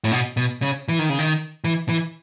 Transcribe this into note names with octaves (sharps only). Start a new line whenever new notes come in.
A2
B2
B2
C#3
E3
D#3
C#3
D#3
E3
E3